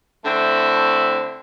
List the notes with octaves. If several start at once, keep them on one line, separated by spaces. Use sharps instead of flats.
D3 A3 C4 E4